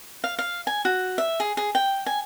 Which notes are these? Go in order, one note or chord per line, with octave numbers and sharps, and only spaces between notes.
F5
F5
G#5
F#4
E5
G#4
G#4
G5
G#5